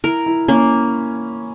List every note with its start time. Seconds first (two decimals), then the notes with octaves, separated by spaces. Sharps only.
0.04 E4 A#4
0.26 E4
0.48 A#3 C#4